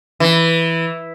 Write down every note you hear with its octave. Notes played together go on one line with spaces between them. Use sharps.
E3